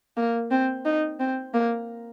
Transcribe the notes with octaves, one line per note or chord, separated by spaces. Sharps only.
A#3
C4
D#4
C4
A#3